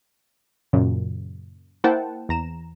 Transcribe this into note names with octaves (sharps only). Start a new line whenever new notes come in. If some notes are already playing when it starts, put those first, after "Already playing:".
F#2 A#2 C#3
A#3 E4 C5 F#5 G5 A5
E2 A#5 E7